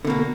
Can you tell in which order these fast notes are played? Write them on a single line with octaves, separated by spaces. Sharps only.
D3 B2 A#3